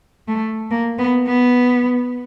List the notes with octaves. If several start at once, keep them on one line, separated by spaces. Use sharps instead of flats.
A3
A#3
B3
B3